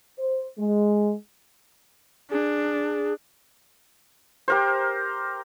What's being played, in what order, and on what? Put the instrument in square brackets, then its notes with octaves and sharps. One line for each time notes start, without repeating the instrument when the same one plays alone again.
[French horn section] C5
G#3
[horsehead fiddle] D4 [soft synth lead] G#4
[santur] G4 A#4 C5